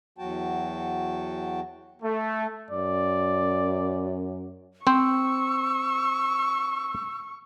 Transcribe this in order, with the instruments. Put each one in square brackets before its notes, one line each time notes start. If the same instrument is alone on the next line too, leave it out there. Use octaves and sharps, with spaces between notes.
[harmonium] E2 F#3 F#4 G5 A5
[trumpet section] A3
[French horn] F#2 [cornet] D5
[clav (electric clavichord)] C4 C5 [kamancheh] C#6 [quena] E6